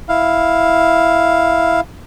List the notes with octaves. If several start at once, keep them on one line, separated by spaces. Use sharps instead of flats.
E4 F5